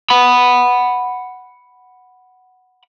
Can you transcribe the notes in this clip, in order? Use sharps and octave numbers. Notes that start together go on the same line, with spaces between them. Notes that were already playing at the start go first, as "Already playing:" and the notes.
F#5 B5